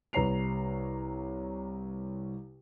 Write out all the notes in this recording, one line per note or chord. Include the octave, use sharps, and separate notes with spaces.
C2 B4 C#5 A#5 C7 F7